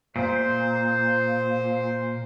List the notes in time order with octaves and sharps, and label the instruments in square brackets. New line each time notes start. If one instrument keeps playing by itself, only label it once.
[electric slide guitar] A#2 [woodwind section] C5